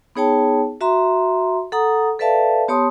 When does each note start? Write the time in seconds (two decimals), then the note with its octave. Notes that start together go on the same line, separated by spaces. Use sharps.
0.16 B3 D#4 G#4 C#5 G5 A5
0.81 F#4 E5 A#5 C6
1.72 A4 F#5 A#5 D#6
2.19 A4 B4 D5 E5 F5 A5
2.68 B3 G4 C#5 A5 C6 D#6